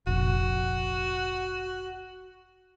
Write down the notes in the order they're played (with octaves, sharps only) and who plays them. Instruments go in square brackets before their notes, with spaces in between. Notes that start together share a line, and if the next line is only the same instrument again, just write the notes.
[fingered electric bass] F1 A#1 [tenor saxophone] F#4